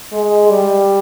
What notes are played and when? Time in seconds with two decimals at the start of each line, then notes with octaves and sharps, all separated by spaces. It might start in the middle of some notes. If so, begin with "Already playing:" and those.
0.12 G#3
0.49 G3